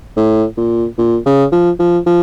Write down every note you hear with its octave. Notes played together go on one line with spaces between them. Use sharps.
A2
A#2
A#2
C#3
F3
F3
F3